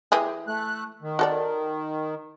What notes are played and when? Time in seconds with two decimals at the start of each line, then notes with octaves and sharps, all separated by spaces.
0.12 E3 G4 G#4
0.48 A3 F#6
1.02 D#3
1.19 F#4 A4 D5